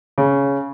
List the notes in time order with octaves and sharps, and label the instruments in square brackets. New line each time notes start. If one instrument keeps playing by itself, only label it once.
[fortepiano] C#3